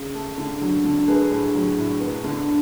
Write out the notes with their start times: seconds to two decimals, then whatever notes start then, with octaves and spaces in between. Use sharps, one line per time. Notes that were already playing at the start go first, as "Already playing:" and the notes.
Already playing: C#3 G#4
0.14 A3
0.38 D3
0.61 F#3
0.84 D3
1.08 A3 G#4 B4
1.30 A2
1.54 F#3
1.78 A2
2.00 B3
2.24 D3